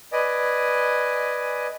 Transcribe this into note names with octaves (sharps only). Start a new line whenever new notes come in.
B4 D5 D#5 G#5